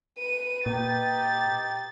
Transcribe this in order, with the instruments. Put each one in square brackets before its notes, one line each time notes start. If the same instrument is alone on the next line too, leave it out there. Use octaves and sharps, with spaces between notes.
[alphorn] B4 [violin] D#7
[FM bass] A#2 [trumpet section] D#4 G4 G5 [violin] A6